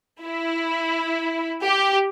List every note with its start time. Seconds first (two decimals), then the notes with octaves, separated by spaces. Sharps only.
0.25 E4
1.63 G4